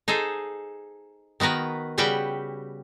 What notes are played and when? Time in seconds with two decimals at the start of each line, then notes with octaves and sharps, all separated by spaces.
0.08 D#4 G#4 A4 C5
1.40 D#3 B3 F#4 A#4 B4
1.98 C#3 G3 F#4 B4 F#5 G5